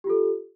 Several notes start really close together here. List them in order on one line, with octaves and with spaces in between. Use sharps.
G4 F4 A4